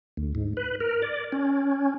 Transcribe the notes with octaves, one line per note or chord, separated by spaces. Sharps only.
D2
G#2
B4
A#4
D5
C#4